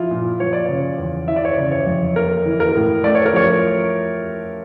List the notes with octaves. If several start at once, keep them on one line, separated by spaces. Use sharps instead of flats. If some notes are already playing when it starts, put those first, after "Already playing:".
Already playing: F3 E4 F4
A#2
F3 C#5
D5
C#3 C#5
E2
E3 E5
D5
C#5
C#3 D5
C#5
F2
A#3 A#4
E3
A#4
A2
A3 D5
C#5
A#4
F3 C#5